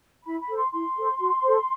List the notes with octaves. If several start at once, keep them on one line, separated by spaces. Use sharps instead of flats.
E4 B5
B5
A4 C5
C6
E4 C6
A4 C5
F#4
A4 C5